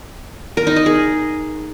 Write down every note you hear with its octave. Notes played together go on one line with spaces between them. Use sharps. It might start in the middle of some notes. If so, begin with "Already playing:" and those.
A#4
D#4
D#5
G#4